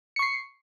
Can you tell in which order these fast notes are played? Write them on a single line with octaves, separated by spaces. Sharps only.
C#7 C#6 C7